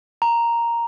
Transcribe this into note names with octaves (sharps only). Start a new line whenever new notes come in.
A#5